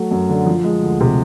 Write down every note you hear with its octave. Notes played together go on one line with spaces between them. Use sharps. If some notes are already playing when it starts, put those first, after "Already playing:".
Already playing: F#3 A3
F#2
D3
F3
G#3
D2
C3